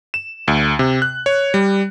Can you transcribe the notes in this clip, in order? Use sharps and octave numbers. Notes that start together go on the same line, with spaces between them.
E7
D2
C3
F#6
C#5
G3